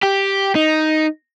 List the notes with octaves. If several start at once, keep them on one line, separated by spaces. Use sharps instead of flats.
G4
D#4